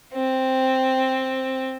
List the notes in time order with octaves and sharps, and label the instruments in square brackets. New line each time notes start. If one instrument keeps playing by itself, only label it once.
[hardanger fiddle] C4